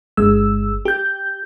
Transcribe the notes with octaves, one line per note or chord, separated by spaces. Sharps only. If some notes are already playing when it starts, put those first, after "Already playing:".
G1 G#3 E6
G4 G6